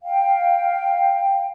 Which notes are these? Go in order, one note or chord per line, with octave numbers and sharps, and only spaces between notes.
F5 G5